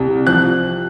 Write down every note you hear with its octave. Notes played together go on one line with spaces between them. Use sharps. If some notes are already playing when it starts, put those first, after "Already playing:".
Already playing: C2 C3
F3 F#6